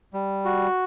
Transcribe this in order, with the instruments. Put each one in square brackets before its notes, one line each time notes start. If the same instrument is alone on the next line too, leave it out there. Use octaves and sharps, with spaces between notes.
[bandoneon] G3
F#4